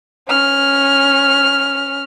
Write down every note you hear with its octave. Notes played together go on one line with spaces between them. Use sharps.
C#4 F6